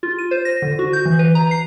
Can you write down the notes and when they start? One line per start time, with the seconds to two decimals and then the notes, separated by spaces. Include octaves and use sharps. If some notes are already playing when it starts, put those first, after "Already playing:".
0.03 F4
0.19 D#7
0.31 C5
0.45 A#6
0.62 D3
0.79 F#4
0.93 G6
1.05 E3
1.19 B4
1.35 A#5
1.51 C7